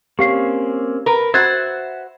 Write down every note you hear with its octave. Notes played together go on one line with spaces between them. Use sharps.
A#3 C4 C#4 G4 F5 C7
A#4 B4
F#4 C5 E5 F#5 F#6 G#6 A6